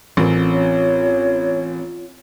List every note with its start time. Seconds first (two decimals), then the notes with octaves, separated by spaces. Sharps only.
0.17 A1 C4 C#4 F4 A#4
0.52 C#5